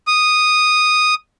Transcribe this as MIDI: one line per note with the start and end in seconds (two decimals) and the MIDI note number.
0.07 1.14 87